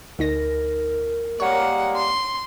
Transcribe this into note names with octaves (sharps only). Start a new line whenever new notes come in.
D2 D#4 A#4 A#6
G3 G#3 A#3 C#5 F#5
C6